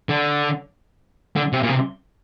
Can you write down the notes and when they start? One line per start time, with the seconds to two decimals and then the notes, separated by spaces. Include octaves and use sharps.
0.09 D3
1.36 D3
1.53 C3
1.63 A#2
1.69 C3